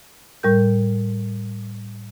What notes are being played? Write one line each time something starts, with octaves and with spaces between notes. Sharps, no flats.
A2 G3 A#4 G6